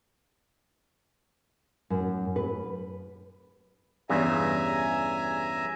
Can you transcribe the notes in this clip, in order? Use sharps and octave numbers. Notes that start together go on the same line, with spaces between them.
F#2
B4
E2 G2 C#3 E5 G#5 A#5